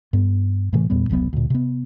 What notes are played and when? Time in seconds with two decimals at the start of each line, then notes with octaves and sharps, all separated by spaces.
0.13 G2 B3
0.73 A2 C3 E3 A3
0.90 E2 A#2 G3 B3
1.09 E1 C2 F#3 B3
1.33 D2 A#2
1.50 C3 B3